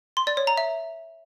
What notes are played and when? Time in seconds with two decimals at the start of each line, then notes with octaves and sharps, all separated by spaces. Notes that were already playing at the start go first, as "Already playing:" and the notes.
0.17 C6
0.27 D5
0.37 C#5
0.47 A#5
0.57 E5